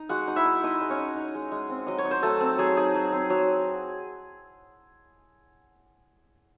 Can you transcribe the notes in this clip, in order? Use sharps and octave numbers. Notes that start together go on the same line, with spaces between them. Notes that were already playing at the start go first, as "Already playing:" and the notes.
Already playing: D#4
G#3 F#4 F#5
D#4
E4 E5
D#4
G#3 D#4 D#5
G#3
C#4 C#5
D#4
D#4
G#3
G#3
C4
F#3 D#5
C#5
D#4
C5
F#3 A3 A4
C4
F#3 G#4
D#4 G#4
F#3
C4
F#3